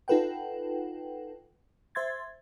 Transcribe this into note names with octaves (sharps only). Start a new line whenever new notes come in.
D#4 F4 A4 B4 F#5 G5
C5 E5 C6 G#6 A6